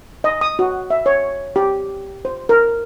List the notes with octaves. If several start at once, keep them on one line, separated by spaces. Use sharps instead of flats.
D#5
D#6
F#4
E5
C#5
G4
C5
A#4